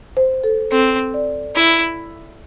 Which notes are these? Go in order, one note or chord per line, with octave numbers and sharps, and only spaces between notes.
C5
A4
C4 A4
D5
E4